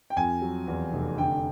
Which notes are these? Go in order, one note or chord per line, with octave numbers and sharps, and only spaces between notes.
G5
F2 G#5
F#3
E2
F1
D3 G5